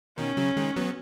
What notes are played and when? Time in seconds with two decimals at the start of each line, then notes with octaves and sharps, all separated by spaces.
0.18 B2 D#3 C#4
0.37 C#3 F#3
0.57 D#3 G#3
0.76 F#3 B3